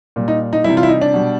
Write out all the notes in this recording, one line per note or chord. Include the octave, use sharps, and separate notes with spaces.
A#2 G3
D#4
D#4
C3 E3 G3 E4
F4
E4
D#4
D4
B2 G3